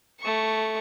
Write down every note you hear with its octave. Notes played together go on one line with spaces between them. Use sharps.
A3 C#6